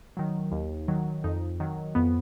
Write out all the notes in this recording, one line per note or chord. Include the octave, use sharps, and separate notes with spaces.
D#3 F#3
D#2
D#3 F#3
F2 D#4
D#3 F#3
F2 B3